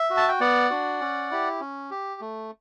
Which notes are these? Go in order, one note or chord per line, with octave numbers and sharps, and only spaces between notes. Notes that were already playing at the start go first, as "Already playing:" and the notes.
Already playing: E5
F#4
A5
G5
B3 D5 F#5
D4 F#4
C#4
E4 G4
C#4
G4
A3